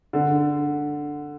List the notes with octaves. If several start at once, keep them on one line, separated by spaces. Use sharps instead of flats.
D3